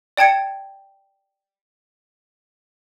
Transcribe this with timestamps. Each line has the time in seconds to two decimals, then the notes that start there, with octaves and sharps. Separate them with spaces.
0.17 D5 G5 A5 G#6 C#7